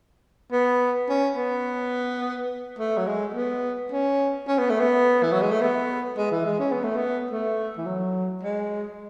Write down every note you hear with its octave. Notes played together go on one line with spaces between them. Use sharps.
B3
C#4
B3
A3
F#3
G#3
B3
C#4
C#4
B3
A3
B3
E3
F#3
G#3
A3
B3
G#3
E3
G#3
C#4
B3
A3
B3
A3
E3
F#3
G#3